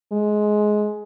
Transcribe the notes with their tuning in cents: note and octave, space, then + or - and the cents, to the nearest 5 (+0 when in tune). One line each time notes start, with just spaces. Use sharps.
G#3 +15